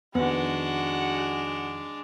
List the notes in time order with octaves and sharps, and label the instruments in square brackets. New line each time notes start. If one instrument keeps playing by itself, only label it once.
[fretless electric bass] F2 D#3 [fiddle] G#3 D4 [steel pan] B3 [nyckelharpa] F#4 F#5